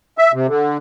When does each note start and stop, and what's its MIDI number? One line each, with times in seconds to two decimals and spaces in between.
0.18 0.32 76
0.33 0.47 48
0.48 0.77 50